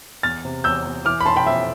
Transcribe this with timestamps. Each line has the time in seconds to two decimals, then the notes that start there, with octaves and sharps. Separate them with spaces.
0.23 E2 F6 A6
0.45 C3
0.64 E2 E6 G6
0.86 E2
1.05 E3 D6 F6
1.20 B5
1.25 F1 A5 C6
1.36 G5 B5
1.46 F2 E5